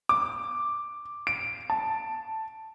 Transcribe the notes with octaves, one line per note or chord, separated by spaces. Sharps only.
D6
D7
A5